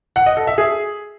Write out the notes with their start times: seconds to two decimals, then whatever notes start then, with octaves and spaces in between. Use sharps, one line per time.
0.16 F#5
0.26 D#5
0.37 A4
0.47 E5
0.58 G#4